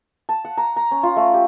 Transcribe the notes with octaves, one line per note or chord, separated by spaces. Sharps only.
A5
F#5
A#5
A#5
C#4
F4
A3
G4